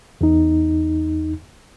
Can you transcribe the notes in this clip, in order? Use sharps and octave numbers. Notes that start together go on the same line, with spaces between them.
E2 D#4